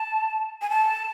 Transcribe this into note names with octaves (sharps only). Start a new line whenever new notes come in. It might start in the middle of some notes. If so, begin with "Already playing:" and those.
Already playing: A5
G#5
A5